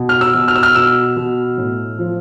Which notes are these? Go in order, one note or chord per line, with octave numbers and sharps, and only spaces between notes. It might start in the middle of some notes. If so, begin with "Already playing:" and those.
Already playing: B2
F6
E6
B2
F6
E6
F6
B2 E6
B2
A2
F3